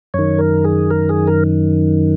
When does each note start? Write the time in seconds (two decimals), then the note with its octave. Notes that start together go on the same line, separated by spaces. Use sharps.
0.14 F#2 D#3 C#5
0.39 A#4
0.64 G#4
0.90 A#4
1.09 G#4
1.27 A#4